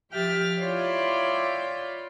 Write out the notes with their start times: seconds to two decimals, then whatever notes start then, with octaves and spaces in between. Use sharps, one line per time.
0.10 F3 G4 E5 G5 F6 A6
0.59 E4 F4 C#5 D5 G5